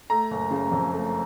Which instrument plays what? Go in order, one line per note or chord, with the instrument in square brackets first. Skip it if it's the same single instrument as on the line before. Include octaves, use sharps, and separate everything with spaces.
[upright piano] A3 A#5
F#1
C#3
F2
A3